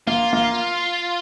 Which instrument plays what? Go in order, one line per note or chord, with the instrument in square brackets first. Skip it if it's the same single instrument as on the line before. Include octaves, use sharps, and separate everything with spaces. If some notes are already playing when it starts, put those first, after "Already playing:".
[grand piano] A#3 [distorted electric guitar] F4
[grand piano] A#3